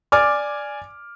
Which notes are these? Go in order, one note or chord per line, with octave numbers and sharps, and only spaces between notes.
D5 G#5 D6 F6